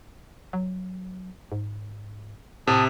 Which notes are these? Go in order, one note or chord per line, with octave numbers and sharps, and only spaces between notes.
F#3
G#2
A2 C3 A5 D#6